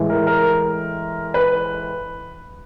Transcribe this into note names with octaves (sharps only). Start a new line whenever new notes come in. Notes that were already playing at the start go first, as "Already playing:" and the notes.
Already playing: A2 E3 G#3
A#4
A#4
B4